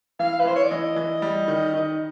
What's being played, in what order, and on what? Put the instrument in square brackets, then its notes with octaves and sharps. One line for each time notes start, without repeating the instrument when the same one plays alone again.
[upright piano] E3 [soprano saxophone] F5
[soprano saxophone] B4
[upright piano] E3 [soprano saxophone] C5
[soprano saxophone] C#5
D5
[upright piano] E3 [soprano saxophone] D#5
[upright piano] E3
G3
D#3
D#3